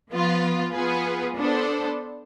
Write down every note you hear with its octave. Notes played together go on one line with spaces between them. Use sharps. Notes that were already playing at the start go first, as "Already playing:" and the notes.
F3 B3 F4
B3 F4 G#4 B4
B3 D4 A4 C5